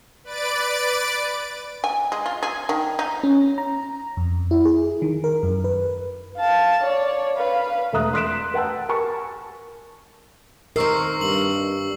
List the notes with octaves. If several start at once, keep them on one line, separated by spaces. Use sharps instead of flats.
B4 D5 A6 D7
G#5
G#3
F4
G#4
D#3
D#4
C#4
A#5
F2
E4
G#4
D#3
A#4
F#2
B4
F5 A5
C#5 D5
B4 F5
E1 A3 E5 A#5 D#6 F#6
C6 D#6 F#6 B6 D7 E7
B4 F#5 G5 A5 E6
A#4 G#5 A5 C#6
D#3 C4 A#4 C#6 E6 C7
G2 C#6 E6 F#7